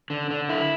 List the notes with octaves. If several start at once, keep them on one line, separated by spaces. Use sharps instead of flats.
D3
D3
E4